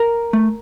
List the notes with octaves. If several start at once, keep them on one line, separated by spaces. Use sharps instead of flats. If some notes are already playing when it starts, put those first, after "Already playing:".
Already playing: A#4
A3